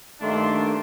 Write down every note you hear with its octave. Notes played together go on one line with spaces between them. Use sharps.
G2 D#3 A3 A#3 D4 C6